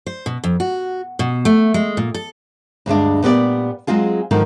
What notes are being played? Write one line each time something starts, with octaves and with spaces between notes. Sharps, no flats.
C5
B2
F2
F#4
B2
A3
G#3
A#2
A4
D2 G2 G#3 D4
A#2 B3 G4 D5
F#3 G#3 C4 F4 G#4
G#2 D3 D#3 F3 F#3